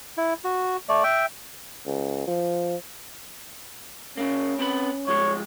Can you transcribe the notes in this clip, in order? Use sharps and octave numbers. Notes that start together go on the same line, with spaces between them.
E4
F#4
A3 D5
E5 G5
C#2
F3
C#3 A#3 C#4
C4 B4 B5
C2 F3 G#3 C#5